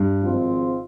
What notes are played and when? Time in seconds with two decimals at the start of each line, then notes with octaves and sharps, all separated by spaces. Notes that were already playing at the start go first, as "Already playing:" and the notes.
Already playing: G2
0.21 G#1 G#2 F3 C4 F4